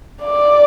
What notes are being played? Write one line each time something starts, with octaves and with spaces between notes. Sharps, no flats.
D5